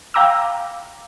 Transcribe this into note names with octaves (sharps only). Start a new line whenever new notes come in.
F5 G5 A#5 D6 E6